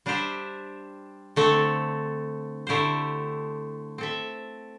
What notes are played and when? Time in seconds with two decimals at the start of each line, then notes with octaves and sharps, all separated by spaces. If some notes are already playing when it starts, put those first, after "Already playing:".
0.06 G3 D4 G4 C5 E5
1.36 D3 A3 C4 A4
2.67 D3 A3 E4 G4 C5
3.98 C4 A4 E5